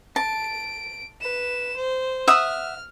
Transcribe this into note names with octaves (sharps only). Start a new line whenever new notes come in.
A5 D7
B4 E7
C5
E5 F#5 D#6 F6